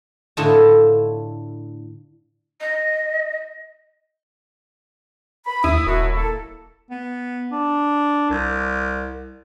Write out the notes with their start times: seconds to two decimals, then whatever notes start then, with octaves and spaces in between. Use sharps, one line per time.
0.37 A2 D3 E4 F4 D#5 A5
2.61 D#5
5.46 B5
5.64 D#2 E4 D#6
5.86 D#1 F#2 B2 F#4
6.15 A#3 A4
6.91 B3
7.51 D4
8.30 C2